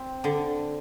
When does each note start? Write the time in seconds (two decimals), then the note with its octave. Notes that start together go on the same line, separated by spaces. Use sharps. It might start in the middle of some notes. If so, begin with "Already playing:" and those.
Already playing: C4
0.24 D3